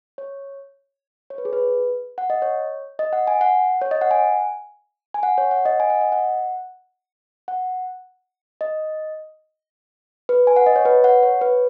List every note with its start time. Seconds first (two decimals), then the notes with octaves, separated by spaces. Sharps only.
0.18 C#5
1.30 C#5
1.38 B4
1.45 G#4
1.53 B4
2.18 F#5
2.30 D#5
2.42 C#5
2.99 D#5
3.13 F#5
3.27 G#5
3.41 F#5
3.81 C#5
3.91 D#5
4.01 F#5
4.11 G#5
5.14 G#5
5.23 F#5
5.38 C#5
5.51 F#5
5.65 D#5
5.80 G#5
5.90 F#5
6.01 D#5
6.12 F#5
7.48 F#5
8.61 D#5
10.29 B4
10.47 G#5
10.56 F#5
10.66 D#5
10.76 C#5
10.85 B4
11.04 F#5
11.23 C#5
11.41 B4